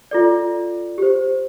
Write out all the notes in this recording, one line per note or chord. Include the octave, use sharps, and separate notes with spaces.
F4 A4 D5
G4 C5